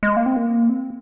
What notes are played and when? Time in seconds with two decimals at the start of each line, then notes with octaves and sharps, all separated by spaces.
0.03 G#3
0.17 A#3
0.26 C4
0.37 A#3
0.69 C4